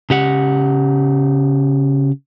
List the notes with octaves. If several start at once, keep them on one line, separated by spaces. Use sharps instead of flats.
C#3 G4 F#5